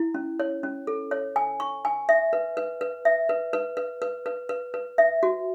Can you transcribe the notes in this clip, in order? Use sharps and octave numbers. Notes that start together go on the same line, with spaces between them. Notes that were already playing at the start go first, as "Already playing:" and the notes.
Already playing: E4
C#4
C#5
C#4
A4
C#5
G#5
C#6
G#5
E5
B4
B4
B4
E5
B4
B4
B4
B4
B4
B4
B4
E5
F#4